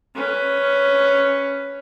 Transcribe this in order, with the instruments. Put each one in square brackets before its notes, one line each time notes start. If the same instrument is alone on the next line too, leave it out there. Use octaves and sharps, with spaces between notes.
[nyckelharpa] C#4 B4